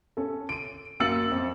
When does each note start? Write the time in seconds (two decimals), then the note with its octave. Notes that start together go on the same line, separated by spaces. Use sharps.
0.17 C#4 A4
0.49 D7 D#7
1.00 F#2 A#3 E6 A6 C#7 F#7
1.32 F2